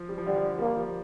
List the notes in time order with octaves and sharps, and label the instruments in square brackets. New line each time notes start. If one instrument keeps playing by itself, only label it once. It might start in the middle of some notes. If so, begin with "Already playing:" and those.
Already playing: [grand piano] F3
G3
F3
[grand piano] D3 [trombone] G3
[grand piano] F3
[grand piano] G3 [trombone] A#3
[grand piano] F3